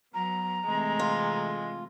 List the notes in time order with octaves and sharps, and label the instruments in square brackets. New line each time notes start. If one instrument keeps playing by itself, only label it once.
[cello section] F#3 B3 [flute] A#5
[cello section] C3 E3 A3 [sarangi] G#3
[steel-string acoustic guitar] F4